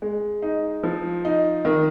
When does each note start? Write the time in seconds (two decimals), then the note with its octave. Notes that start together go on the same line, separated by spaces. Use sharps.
0.02 G#3
0.42 D#4
0.83 F3
1.25 D#4
1.65 D#3